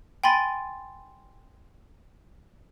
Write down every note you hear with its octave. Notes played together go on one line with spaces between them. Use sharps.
G5 G#5 B5 C6 A6 D#7